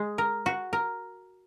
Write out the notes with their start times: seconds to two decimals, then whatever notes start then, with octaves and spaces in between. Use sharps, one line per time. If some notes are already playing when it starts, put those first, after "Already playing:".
Already playing: G#3
0.18 A#4
0.46 F#4
0.73 A#4